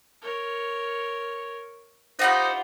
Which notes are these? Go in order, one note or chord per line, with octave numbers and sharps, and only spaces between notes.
A#4 C#5
D#4 F4 G4 C5 D#5 F#5 B5